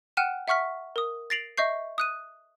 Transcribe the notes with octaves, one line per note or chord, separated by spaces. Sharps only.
F#5 G5 F6 F#6 D#7 E7
E5 F#5 C#6 F6 B6
A#4 D#6
A6 A#6 C7 D7 F7 F#7
D#5 E5 C#6 G6 C7
D#6 F#6 D#7